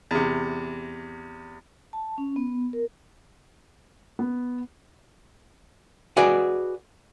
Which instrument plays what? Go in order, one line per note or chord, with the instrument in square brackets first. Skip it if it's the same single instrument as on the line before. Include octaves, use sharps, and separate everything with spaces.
[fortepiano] E2 C3
[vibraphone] A5
C#4
B3
A#4
[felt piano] B3
[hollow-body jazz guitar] F#4 G#4 B4 D5 D#5